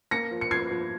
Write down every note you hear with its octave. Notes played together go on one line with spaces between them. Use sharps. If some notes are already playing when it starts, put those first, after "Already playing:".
A#3 A#6 C#7
F3
C#7
F3 G#6 C7
F3